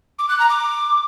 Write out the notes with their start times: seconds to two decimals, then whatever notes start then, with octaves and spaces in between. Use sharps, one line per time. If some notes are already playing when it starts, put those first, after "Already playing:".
0.19 D6
0.29 F#6
0.39 A#5
0.49 D6